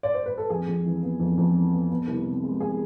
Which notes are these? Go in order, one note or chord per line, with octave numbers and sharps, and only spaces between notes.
D5
C5
B4
A4
F2 G#4
F2
E3
B3
F2
F2
E3
B3
B3
C2
C3
G#3
B3 G#4